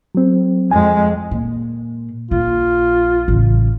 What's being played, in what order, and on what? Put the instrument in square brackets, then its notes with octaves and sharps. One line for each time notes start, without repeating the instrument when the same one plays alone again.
[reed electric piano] F#3 C4
[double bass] F2 G#3 [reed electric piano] G#5
[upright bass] A#2
[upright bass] A#1 [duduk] F4
[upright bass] A1 C#3